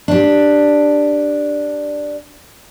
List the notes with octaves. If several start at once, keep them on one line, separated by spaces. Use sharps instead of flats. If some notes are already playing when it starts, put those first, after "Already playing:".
D4 G4